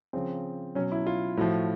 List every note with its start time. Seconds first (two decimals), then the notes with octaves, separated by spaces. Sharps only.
0.13 C#3 F3 C4
0.75 B2 F#3 C#4
0.92 E4
1.07 F4
1.37 A2 F3 F#4